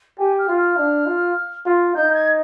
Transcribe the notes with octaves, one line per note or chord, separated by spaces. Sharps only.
G4 G#5
F6
F4
F6
D4
F4
F4
D#4 G6
G#6